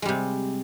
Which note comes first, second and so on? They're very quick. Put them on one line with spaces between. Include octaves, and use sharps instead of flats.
G#3 G3 C3